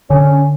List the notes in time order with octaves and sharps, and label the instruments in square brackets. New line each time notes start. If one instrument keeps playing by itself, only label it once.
[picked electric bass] D3 [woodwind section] C#4